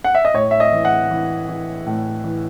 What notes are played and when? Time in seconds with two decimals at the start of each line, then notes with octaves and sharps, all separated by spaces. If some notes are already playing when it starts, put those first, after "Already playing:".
0.04 F#5
0.15 E5
0.25 D#5
0.34 A2 C#5
0.51 E5
0.60 D#5
0.72 E3
0.85 F#5
1.11 E3
1.49 E3
1.86 A2
2.24 E3